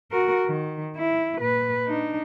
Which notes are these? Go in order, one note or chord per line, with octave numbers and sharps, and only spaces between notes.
F#4 A#4
D#3
E4
A#2 B4
D4 D#4